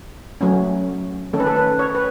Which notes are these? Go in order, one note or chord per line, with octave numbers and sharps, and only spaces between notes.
F#3 A3 C#4
D#3 A3 C#4 A4
B4
A4
B4
C#5
B4